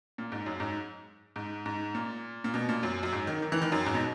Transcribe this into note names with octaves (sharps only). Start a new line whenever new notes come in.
A#2
G#2
F#2
G#2
G#2
G#2
A#2
A#2
B2
A#2
F#2
F#2
G#2
D#3
D#3
E3
D#3
F#2
G#2
B2